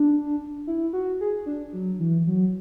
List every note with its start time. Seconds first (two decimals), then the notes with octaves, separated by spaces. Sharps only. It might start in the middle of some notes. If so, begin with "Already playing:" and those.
Already playing: D4
0.67 E4
0.93 F#4
1.21 G#4
1.46 D4
1.73 F#3
1.99 E3
2.27 F#3